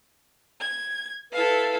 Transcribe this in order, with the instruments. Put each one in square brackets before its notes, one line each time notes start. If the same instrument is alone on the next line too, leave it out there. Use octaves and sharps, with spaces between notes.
[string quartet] G#6
[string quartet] E4 A4 F5 [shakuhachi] B4